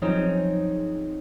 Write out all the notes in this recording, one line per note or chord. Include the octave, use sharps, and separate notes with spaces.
F3 F#3 C4 C#4 D#4 G#4